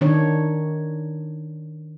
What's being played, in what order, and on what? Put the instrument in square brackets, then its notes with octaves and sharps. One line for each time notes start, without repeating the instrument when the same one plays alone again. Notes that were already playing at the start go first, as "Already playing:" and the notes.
[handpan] D#3 D4 C#5